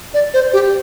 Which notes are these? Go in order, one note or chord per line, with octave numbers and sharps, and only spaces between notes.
D5
C5
G4